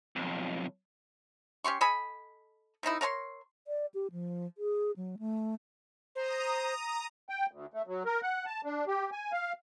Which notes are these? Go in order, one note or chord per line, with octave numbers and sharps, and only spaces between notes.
B1 F2
C#4 G4 C6 C#6
A4 D#5 G#5 B5
C3 D#3 D#4 E4
A#4 C#5 A5 C6
D5
G4
F3
G#4
F#3
A3
C5 A#5 D#6
G5
D2
A3
F#3
A#4
F#5
A5
D4
G4
G#5
F5